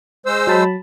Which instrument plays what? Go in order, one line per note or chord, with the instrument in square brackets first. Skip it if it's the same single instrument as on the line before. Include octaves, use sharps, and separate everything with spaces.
[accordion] G#3 C5 E6
[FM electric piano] F#3 A5 B5